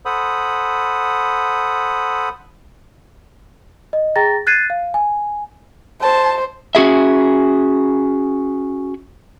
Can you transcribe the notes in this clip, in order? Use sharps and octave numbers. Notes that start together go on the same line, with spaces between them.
A4 C5 F#5 B5 D#6
D#5
G#4 G5 A#5 A6 A#6
F#6 G#6 A6 C7 D#7
F5
G#5
C5 A5
C#4 F#4 G#4 E5